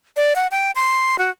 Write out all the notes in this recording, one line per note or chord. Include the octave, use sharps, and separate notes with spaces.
D5
F#5
G5
C6
F#4